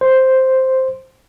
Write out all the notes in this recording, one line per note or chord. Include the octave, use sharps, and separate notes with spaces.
C5